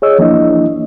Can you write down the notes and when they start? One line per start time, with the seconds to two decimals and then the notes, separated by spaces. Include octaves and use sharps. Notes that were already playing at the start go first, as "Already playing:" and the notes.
0.02 G#4 C#5 D#5 E6
0.19 E3 F3 A#3 D4 E4 D#5